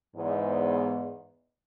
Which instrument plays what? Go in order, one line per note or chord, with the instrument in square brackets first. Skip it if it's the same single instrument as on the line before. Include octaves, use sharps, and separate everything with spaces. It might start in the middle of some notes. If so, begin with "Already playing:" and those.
[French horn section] E2 G#2